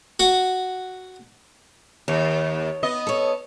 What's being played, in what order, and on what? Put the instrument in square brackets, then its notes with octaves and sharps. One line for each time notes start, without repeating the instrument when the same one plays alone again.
[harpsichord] F#4 F#5
[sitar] D#2 [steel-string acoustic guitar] C#5
[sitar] B3 D#5
[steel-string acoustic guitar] A4 C#5